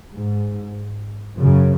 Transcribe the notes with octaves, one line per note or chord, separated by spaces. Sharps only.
G#2
F#2 C#3